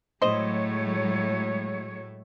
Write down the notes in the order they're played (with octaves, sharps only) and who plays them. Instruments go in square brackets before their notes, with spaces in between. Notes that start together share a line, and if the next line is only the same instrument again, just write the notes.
[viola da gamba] A2 A3 [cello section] F#3 G#3 C#5 [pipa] C5 D#5